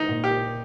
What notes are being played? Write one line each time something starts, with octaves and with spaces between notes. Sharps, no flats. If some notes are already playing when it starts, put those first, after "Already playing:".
Already playing: D#4
A#2
G4